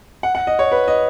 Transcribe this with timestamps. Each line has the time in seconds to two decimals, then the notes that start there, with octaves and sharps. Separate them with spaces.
0.23 F#5
0.35 F#5
0.47 D#5
0.59 C#5
0.72 B4
0.88 D#5